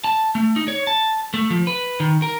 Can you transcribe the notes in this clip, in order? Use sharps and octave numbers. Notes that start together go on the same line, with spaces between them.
A5
A3
D#4
C#5
A5
A3
F3
B4
D#3
A#4